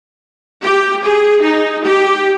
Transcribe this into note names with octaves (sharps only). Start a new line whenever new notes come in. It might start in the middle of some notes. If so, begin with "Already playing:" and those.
G4
G#4
D#4
G4